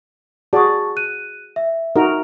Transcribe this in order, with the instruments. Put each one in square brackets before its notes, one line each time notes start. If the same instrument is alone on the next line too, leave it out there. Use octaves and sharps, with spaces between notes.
[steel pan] F#4 G#4 D5 [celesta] A5 C#6
[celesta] F#6 D#7
E5
[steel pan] D#4 F#4 A#4